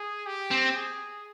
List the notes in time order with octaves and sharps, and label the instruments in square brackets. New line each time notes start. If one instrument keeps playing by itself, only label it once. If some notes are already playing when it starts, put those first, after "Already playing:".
Already playing: [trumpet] G#4
G4
[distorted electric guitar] C4
[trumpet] G#4